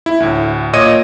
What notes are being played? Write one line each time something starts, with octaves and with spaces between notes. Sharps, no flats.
E4
D2 A2
A#2 C#5 D#5 D#6 G#6 D#7